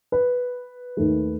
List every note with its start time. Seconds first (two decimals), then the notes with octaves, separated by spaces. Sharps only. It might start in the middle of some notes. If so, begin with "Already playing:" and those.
0.12 B4
0.97 D#2 D#3 A3